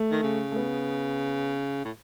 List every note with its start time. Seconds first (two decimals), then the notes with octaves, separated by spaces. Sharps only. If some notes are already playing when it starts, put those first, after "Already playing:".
Already playing: A3
0.11 D#3
0.22 C#3
0.51 A3
0.56 B3
1.85 A2